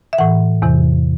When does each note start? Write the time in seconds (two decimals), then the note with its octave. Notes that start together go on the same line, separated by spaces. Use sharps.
0.13 E5
0.18 A2 E3 F#5
0.62 E2 C3 E3